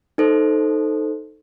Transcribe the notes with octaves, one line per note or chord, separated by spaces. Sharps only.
D#4 A4 C5